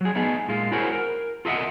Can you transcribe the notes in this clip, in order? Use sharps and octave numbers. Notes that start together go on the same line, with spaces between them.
F#3 G#4
A3 B3 D#4 G#4
A#2 G#3 F4
E4 F#4 G#4 A#4 C5 C#5
A#4
F4 A4 A#4 D#5 E5 F#5